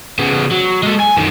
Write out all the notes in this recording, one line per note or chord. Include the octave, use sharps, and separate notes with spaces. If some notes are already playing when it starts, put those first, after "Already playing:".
C#3 B3
F#3
G#3 A4
G#5
F#2 D#3